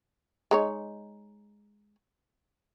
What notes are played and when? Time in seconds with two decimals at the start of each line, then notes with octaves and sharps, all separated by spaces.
0.51 G#3 D#4 C#5